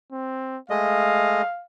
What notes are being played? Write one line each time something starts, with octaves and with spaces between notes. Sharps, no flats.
C4
G#3 A3 D#5 F5